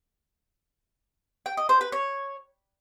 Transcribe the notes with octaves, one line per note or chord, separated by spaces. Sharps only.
G5
D#5
C5
B4
C#5